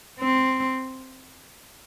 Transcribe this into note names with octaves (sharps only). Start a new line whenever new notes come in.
C4